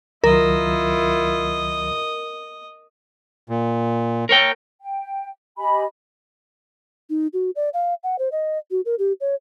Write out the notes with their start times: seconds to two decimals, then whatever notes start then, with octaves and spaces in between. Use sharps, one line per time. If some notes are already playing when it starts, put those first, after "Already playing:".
0.24 C#2 D#3 F#3 E4 F4 A#4 D#5
3.49 A#2
4.29 A#4 C#5 G5
4.81 G5
5.58 G4 D#5 G#5 B5
7.10 D#4
7.33 F#4
7.56 D5
7.73 F5
8.03 F#5
8.19 C5
8.32 D#5
8.71 F#4
8.85 A#4
8.99 G4
9.21 C#5